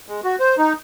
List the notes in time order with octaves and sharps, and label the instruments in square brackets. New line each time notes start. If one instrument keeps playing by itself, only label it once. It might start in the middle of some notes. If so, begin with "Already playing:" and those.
[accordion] G#3
F#4
C5
D#4